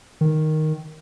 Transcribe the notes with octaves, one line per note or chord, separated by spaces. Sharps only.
D#3